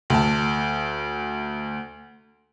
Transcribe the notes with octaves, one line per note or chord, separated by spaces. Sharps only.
D2 A5